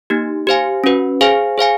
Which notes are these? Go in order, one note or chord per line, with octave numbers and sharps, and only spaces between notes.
A#3 D#4 G4
G4 C5 F5 G#5
C#4 F#4 B4
G#4 C5 F5 G#5
G#4 C5 F5 G#5